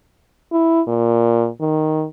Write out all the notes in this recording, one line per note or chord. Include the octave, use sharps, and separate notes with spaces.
E4
A#2
D#3